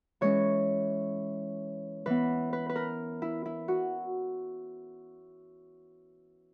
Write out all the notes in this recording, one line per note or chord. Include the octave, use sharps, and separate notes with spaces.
E3 G#3 C#4 C#5
E3 B3 B4
B4
B4
A#4
E4
E4
F#4